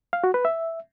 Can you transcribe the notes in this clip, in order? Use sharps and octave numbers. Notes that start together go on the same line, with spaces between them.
F5
F#4
B4
E5